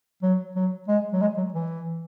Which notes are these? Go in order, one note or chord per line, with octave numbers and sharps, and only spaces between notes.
F#3
F#3
G#3
F#3
G#3
F#3
E3